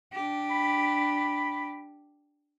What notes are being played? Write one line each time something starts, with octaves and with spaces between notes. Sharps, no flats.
D4 G4
B5